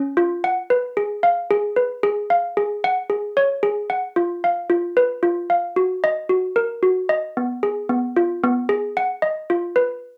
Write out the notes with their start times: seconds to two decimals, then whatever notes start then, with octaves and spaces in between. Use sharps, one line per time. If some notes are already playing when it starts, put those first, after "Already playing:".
Already playing: C#4
0.17 F4
0.44 F#5
0.70 B4
0.97 G#4
1.23 F5
1.51 G#4
1.76 B4
2.03 G#4
2.30 F5
2.57 G#4
2.84 F#5
3.10 G#4
3.37 C#5
3.63 G#4
3.90 F#5
4.16 F4
4.44 F5
4.70 F4
4.97 B4
5.23 F4
5.50 F5
5.76 F#4
6.04 D#5
6.29 F#4
6.56 A#4
6.83 F#4
7.09 D#5
7.37 B3
7.63 G#4
7.89 B3
8.17 F4
8.44 B3
8.69 G#4
8.97 F#5
9.22 D#5
9.50 F4
9.76 B4